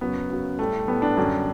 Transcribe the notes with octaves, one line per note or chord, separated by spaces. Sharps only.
F#2 C#3 F#3 B3
F#2 C#3 F#3
A2 G3 A3
A2 G3 B3
D4
F#2 D3 G3